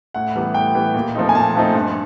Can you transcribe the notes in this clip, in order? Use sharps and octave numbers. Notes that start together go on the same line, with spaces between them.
A2 F#5
E3 G3 B3
A2 G5
E3 G3 B3
A#2
F3 A3 C4 D#4
G#5
A#2 A5
F3 A3 C4 D#4
G2